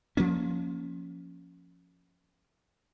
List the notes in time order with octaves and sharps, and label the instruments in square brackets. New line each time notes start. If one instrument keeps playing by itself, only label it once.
[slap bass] F3 A#3 C#4